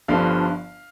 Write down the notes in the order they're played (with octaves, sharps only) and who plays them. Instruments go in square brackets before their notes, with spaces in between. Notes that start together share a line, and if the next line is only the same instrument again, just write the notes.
[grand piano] G1 G2 D3 F3 F5